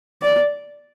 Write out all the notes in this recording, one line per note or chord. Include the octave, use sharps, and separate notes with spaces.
D5